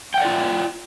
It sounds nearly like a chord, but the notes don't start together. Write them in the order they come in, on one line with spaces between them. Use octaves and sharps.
G5 F#5 D5 F4